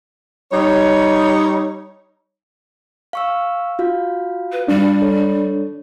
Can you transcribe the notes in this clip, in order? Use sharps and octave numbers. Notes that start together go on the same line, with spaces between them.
G3 D#4 C#5
F5 C#6 E6
F4 F#4 F5
B4
G3 D4
A4 C#5